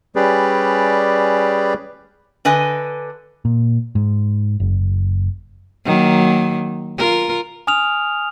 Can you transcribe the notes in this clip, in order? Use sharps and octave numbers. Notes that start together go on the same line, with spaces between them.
G3 C#4 G4 G#4 B4 D5
D3 B4 D#5 G#5
A#2
G#2
F#1
D#3 F#3 A#3
F4 A#4
G#5 D#6 F6 F7